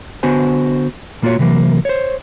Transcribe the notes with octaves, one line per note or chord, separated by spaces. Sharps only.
D3 B3 F#4 C5 G#5
A#2 A#3 F4 F#4 C#5
C3 E3 F#3 A#3
C5 C#5